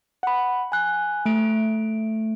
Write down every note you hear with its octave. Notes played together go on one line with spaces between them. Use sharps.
F#5 B5
G#5 F#6
A3 D7